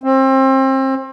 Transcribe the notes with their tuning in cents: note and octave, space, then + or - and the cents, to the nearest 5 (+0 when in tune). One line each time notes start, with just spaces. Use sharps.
C4 +30